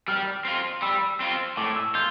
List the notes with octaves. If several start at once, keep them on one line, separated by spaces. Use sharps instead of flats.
G3 F6
C4 F4
G3 E6
C4 F4
A2 D6
E6
F4 G6